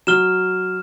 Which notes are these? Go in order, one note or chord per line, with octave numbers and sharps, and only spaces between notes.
F#3 F6 E7 G7